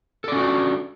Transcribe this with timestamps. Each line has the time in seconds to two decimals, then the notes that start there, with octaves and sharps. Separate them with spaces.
0.24 A4
0.28 D5
0.32 C#4
0.36 F#4
0.40 D4